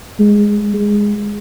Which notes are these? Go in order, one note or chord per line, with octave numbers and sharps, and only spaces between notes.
G#3
G#3